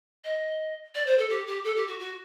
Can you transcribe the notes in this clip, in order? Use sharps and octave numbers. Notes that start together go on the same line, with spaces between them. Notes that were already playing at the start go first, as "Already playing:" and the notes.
D#5
D5
C5
A4
G4
G4
A4
G4
F#4
F#4